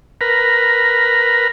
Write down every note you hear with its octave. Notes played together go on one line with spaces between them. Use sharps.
A#4 B4